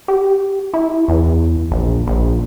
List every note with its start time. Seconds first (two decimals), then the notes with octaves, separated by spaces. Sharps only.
0.08 G4
0.74 E4
1.08 E2
1.71 A#1
2.07 A#1